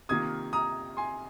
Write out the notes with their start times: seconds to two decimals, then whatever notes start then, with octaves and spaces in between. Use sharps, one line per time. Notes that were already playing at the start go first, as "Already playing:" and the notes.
0.09 C3 D#3 A#3 F4 D#6 G#6
0.53 A#5 D#6
0.97 G#5 C6